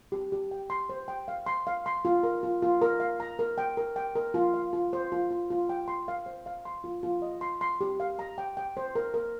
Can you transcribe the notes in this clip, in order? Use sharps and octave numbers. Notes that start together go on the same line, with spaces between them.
G4
G4
G5
C6
C5
G5
F5
C6
F5
C6
F4
A#4
F4
F4
A#4
F5
A#5
A#4
G5
A#4
G5
A#4
F4
F5
F4
C5
F4
F4
F4
G5
C6
F5
C5
F5
C6
F4
F4
D#5
C6
C6
G4
F5
A#5
G5
G5
C5
A#4
A#4